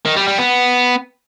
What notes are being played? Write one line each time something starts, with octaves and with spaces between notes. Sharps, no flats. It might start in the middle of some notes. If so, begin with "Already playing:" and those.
D#3
G3
G3
B3